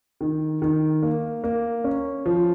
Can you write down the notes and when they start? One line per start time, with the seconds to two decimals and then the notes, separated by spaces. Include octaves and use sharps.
0.21 D#3
0.62 D#3
1.03 A#3
1.44 A#3
1.84 C#4
2.26 F3